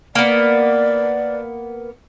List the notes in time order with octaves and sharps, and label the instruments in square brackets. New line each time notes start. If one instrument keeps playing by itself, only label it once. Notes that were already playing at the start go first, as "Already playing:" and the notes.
[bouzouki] A#3 B3 [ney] D5